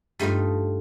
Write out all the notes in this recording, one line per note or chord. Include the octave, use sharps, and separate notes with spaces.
G2 A3 D#4 F4 D#5